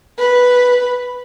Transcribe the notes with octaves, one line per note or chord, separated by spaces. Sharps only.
B4